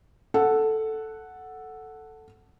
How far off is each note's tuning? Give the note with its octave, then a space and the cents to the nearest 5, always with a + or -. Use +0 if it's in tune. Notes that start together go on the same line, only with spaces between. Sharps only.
A4 +0 F#5 +0